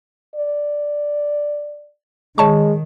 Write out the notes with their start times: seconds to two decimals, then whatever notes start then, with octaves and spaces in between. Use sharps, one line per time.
0.35 D5
2.38 D#3 G#3 C#5 A5 C#6